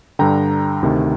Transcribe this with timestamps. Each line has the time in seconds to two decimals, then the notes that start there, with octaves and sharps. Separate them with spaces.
0.19 G2 D3 G5 A#5
0.82 D2 C3 D#3